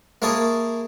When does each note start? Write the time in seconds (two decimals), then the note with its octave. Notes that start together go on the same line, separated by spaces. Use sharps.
0.22 A#3 E4 G#4 C#5 A5 D#6